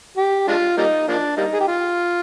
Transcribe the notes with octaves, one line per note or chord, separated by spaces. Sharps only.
G4
G#3 D4 F4
G3 A#3 D#4
F3 A#3 D4
G3 A#3 D#4
G#4
G4
F4